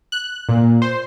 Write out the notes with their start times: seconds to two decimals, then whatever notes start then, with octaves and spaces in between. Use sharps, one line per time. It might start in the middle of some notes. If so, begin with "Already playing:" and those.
0.12 F#6
0.49 A#2
0.82 C5